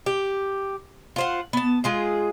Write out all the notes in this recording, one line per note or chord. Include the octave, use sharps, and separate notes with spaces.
G4
F4 C5 F#5
B3 A5
G#3 F4 G#4